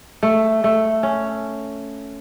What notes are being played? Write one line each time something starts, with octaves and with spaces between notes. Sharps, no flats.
A3
A3
C#4